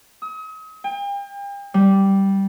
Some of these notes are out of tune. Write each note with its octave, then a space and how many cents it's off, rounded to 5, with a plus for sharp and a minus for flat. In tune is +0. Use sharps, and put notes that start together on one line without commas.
D#6 +40
G5 +40
G3 -5